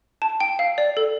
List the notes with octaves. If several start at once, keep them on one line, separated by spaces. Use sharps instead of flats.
A5
G5
F5
D5
A4